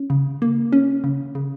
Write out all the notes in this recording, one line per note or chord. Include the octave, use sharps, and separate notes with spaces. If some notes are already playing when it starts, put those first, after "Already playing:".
Already playing: C#4
C#3
A#3
C#4
C#3
C#3